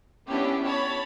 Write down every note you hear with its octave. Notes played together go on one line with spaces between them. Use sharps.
B3 C#4 D4 E4 G4
C#5 A5 B5